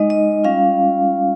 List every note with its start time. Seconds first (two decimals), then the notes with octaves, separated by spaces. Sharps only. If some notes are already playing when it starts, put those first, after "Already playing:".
Already playing: G#3 D#4 D#5
0.10 D#5
0.44 G3 C#4 F4 F5